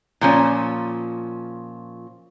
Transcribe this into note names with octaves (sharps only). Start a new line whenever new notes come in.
A#2 F3 C#4